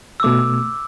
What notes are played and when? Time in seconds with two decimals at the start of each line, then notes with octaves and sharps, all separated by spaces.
0.20 E6
0.23 B2 A3 D6